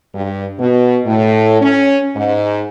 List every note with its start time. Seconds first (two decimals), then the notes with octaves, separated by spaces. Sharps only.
0.15 G2
0.59 B2
1.05 A2
1.61 C#4
2.16 G#2